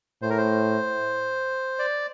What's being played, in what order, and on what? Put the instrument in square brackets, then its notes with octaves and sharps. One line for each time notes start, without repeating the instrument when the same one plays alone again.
[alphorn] A2 [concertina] C5
[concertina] A#4
C5
D5